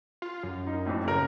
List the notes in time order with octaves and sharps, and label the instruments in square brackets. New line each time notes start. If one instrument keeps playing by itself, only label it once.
[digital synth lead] F4
F#2
[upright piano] D#4
F2 A2
C#3 A#4